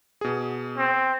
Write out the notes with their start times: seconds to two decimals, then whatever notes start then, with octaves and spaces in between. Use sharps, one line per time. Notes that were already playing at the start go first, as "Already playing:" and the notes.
0.21 B2 G#4
0.78 C4